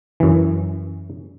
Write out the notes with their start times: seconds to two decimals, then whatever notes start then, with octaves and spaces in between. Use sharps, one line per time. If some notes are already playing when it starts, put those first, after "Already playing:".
0.20 F#2 E3